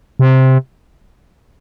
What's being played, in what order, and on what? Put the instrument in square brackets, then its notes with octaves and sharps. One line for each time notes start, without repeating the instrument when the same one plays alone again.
[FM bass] C3